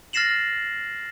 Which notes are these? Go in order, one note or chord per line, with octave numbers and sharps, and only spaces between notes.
F6 A6 A#6 C7 E7 F#7